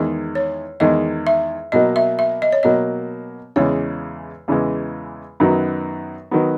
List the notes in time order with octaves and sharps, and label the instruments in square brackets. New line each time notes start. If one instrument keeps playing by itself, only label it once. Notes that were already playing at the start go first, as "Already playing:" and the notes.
Already playing: [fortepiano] E2 D#3 G#3 [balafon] D#5
[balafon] C#5
[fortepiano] E2 D#3 G#3 [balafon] D#5
[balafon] E5
[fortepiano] B2 F#3 A#3 [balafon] D#5
[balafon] E5
E5
D#5
C#5
[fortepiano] B2 F#3 A#3 [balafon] D#5
[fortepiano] E2 C#3 E3 G#3 [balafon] C#5
[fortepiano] E2 C#3 E3 G#3
F#2 D#3 F#3 B3
D#3 F#3 B3